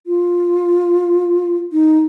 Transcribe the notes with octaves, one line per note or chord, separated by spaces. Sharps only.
F4
D#4